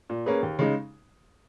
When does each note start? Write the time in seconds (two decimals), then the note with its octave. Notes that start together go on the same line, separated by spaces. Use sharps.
0.10 A#2
0.26 A#3 C#4 G#4 B4
0.43 D#2
0.59 C#3 G#3 D#4